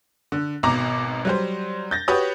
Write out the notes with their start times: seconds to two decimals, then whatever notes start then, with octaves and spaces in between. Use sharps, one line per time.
0.32 D3
0.63 G#1 B2 A#5 D6
1.25 F#3 G3 C5
1.91 G6 A6 A#6
2.08 F#4 G4 B4 C#5 D#6